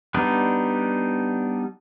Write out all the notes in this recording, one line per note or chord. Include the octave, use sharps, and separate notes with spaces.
G3 B3 D4 D#4